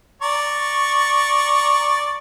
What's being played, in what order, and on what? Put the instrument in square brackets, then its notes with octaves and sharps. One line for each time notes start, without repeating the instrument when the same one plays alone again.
[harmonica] D5 A#5 C#6